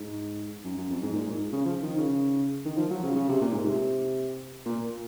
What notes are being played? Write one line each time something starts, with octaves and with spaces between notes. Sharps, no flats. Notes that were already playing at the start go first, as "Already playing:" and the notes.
Already playing: G#2
F#2
F#2
F2
G#2
A#2
G#2
C#3
F3
D#3
C#3
D#3
F3
F#3
C#3
C#3
C3
A#2
G#2
C3
A#2